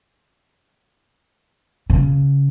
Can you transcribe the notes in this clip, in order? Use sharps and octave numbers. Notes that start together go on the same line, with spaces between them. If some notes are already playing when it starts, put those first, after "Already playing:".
C#3